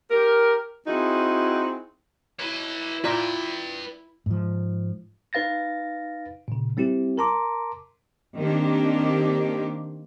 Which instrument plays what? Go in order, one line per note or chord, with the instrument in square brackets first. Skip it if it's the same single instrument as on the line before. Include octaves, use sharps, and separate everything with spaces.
[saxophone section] G4 A#4
C4 D#4 E4 F#4 G#4
[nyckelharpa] E4 [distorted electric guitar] B4 C#5
[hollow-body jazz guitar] F4 D5 A#5 [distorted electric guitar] B4 G5
[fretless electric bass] G#2 F3
[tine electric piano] D#4 B4 F5 A6 A#6
A#2 C#3
G3 C4 E4 G4
A#4 A5 A#5 C6 D6
[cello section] D#3 A#3 C4 D4 G4